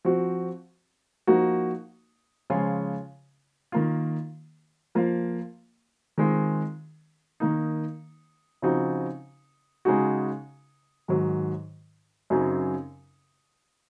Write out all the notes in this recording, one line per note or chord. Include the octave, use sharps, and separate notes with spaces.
F3 C4 F#4
F3 A#3 D#4 F#4
C#3 F3 G#3 C#4 F4
D#3 A#3 F4
F3 A#3 F4
D#3 G#3 C4 F4
D#3 A#3 D#4
C#3 F3 C4 D#4 F#4
C#3 G#3 D#4 F#4
G#2 D#3 F#3
F#2 C#3 F#3 C4 D#4